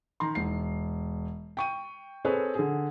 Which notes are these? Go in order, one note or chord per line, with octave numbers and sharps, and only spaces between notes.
D#3 A#5 C6
E1 C7
G5 C#6 D#7
C4 G#4 A4 B4 C#5
D3 G#4